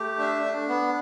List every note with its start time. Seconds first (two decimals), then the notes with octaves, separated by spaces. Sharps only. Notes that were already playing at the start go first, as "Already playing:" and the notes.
Already playing: A3 G4
0.18 D4 E5
0.44 D4
0.68 B3